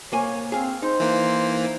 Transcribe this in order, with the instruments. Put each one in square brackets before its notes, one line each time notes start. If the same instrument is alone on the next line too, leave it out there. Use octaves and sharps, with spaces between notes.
[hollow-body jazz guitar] C2 A#3 G#5 [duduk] C#5
[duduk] C4 [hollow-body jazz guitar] G#4 F5
[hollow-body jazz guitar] D#4 [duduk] C5
[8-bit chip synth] E3 A#3